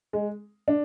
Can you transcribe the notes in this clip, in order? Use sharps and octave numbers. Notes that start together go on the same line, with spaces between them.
G#3
D4